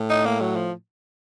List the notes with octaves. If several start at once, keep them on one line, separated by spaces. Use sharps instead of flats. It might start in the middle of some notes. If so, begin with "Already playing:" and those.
Already playing: A2
D#4
A#3
F#3
F3